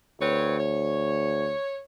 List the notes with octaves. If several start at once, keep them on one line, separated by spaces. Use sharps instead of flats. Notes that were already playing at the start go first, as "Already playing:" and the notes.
D2 C4 B4 C#5
C#5